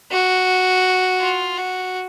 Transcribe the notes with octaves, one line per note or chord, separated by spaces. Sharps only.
F#4
F4
F#4